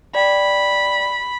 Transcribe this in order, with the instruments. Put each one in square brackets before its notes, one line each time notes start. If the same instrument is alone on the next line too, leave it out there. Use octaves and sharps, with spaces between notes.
[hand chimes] D5 G5 [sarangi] B5